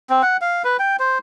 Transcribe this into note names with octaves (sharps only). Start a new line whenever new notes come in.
C4
F#5
F5
B4
G5
C5